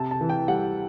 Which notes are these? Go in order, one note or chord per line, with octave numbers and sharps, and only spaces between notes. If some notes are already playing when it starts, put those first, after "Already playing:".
Already playing: C3 A5
A5
E3
G5
G3 F#5